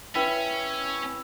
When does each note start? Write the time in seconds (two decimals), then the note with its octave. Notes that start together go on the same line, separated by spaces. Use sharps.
0.15 C#4 E4 B4 G5 B6